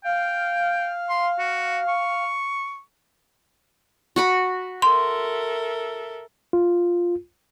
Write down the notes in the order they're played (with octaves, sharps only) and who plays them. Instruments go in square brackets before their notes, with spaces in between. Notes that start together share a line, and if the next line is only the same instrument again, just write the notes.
[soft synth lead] F5 [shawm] G5
[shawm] C6
F#4
C#6
[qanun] F#4 F#5 B5
[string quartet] A4 A#4 E5 [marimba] C6
[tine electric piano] F4